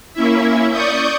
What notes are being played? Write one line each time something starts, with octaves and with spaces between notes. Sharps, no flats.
A#3 C#4 E4 E5
D5 C#6 D#6 G6